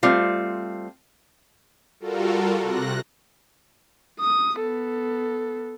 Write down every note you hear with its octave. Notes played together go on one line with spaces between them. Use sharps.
G3 A3 C4 F4
G3 F4 F#4 A4 A#4
C3 F#6 A#6
D#6
B3 A4